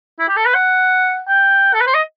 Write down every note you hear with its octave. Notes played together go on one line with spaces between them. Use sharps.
E4
G4
A4
B4
F#5
G5
A4
B4
C5
D#5